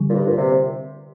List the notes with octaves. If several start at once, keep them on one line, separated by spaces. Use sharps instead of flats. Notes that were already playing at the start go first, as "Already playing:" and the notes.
Already playing: D3 G3
A#2
G2
A#2
C3